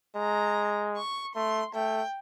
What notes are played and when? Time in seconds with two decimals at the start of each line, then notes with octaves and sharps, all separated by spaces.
0.16 G#3 A#5
0.95 C#6
1.35 A3 C6
1.74 A3 G5